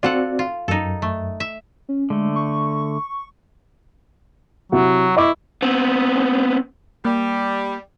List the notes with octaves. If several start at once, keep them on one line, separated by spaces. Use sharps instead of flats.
C4 F4 F#4 A4 D5 F#5
F4
F#2 D#4 A4
A3
E5
C#4
D3 G#3 A3
C#6
C3 F#3 E4 F#4
E4 D#5 C#6 D6
B3 C4
G3 A#3